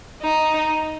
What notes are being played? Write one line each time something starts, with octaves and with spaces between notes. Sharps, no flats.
D#4